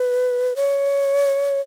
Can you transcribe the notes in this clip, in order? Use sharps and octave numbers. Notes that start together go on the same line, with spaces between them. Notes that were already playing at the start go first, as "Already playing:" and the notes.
Already playing: B4
C#5